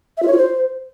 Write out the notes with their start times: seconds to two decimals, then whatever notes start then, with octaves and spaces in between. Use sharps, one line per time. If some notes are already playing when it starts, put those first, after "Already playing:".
0.17 E5
0.22 F4
0.27 C#5
0.33 F4
0.38 C5